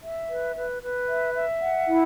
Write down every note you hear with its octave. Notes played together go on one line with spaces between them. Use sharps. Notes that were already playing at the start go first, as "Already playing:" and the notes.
E5
B4
B4
B4
E5
E5
F#5
E4